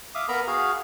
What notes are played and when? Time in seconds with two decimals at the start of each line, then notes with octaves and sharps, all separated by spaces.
0.15 E5 F5 D6 D#6
0.28 B3 A#4 A#5 B5
0.47 F#4 G#4 F5